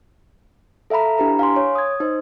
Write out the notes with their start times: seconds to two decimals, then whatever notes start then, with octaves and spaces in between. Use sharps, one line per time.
0.90 A4 E5 F5 A#5 B5
1.18 D4 E4 G4 B4 A#5
1.39 F5 G#5 C6
1.56 C#5
1.75 D#6 G#6
2.00 D#4 C5